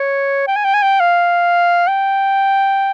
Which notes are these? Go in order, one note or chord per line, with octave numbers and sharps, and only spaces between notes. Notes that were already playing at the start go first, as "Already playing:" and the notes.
Already playing: C#5
G5
G#5
G5
G#5
G5
F5
G5